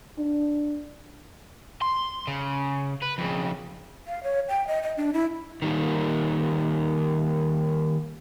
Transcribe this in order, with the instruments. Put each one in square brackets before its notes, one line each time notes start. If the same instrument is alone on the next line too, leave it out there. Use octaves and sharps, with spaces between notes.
[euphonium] D4
[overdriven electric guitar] C6
C#3
B4
F2 C#3
[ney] F5
C#5
G5
D#5
D#5
D4
E4
[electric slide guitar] D#3 G3 A#3